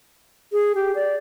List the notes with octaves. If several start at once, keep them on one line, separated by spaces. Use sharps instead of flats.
G#4
G4
D5